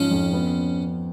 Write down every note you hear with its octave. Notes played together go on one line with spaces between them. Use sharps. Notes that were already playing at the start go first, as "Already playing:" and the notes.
Already playing: G#2 F3 C#4
F2
B3